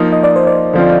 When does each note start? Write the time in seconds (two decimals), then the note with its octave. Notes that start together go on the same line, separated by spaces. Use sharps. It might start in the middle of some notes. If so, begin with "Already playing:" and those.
Already playing: F3 A#3 D#4 D#5
0.13 D#5
0.23 D5
0.36 C5
0.47 D5
0.73 D3 F3 C4 F4